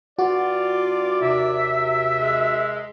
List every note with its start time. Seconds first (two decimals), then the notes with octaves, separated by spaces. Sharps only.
0.19 G2 F4 F#4 D5
1.21 D#2 C3 E5
2.19 G#3